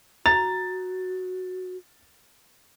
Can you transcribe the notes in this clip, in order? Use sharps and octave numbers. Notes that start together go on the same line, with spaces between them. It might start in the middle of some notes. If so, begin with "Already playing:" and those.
F#4 A#5 A6